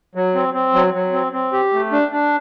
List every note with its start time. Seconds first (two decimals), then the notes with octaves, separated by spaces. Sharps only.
0.15 F#3
0.35 C4
0.54 C4
0.74 F#3
0.94 F#3
1.13 C4
1.32 C4
1.53 G4
1.73 A3
1.92 D4
2.12 D4